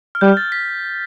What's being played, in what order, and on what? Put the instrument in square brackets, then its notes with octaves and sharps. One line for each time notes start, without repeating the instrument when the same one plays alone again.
[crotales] F6
[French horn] G3 [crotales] G6
[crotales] A6
B6